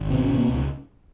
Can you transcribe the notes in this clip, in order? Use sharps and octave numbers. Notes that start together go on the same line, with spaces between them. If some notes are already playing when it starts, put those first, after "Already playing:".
Already playing: G#1
B2 C4
C#4
B2
A#3 C4
C#2